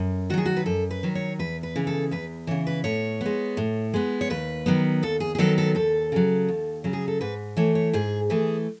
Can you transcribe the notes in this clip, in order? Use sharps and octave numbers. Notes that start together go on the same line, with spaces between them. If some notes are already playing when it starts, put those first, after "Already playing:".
Already playing: F#2
D#3 F#3 F#4 G#4
F#4
B4
F#2 A4
B4
D#3 F#3
C#5
E2 B4
B4
C#3 E3
A4
E2 B4
C#3 E3 C#5
B4
A2 C#5
G#3 B3
A2
G#3 B3
C#5
D#2 B4
D#3 F#3 B3
D#2 A4
G#4
G#4
D#3 F#3 B3 A4
A4
D#2 A4
C#3 F#3
D#2
C#3 F#3
G#4
A4
G#2 B4
E3 A3 C#5
C#5
G#2 G#4
E3 A3 G#4